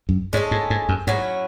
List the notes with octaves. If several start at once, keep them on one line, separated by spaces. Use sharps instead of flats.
F#2
G#2 G#3 C#4 F#4 A4
G#2
G#2
F#2
G#2 F#3 C#4 E4